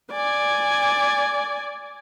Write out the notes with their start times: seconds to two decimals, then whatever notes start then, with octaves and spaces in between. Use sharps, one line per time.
0.12 D5 G#5